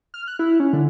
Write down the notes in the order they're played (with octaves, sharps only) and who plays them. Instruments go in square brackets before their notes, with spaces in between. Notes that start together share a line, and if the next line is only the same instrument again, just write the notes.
[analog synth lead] F6
F#6
E4
C#4
D3